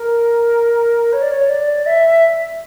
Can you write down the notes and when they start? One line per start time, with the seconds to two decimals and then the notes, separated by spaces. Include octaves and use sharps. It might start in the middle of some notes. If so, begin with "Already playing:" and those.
Already playing: A#4
1.13 C#5
1.22 D5
1.31 C#5
1.50 D5
1.86 E5